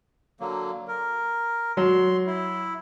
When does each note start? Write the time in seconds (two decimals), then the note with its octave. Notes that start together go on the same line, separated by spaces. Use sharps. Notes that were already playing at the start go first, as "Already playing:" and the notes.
0.40 D3 F#3 A#3
0.88 A#4
1.77 F#3 C6
2.27 E4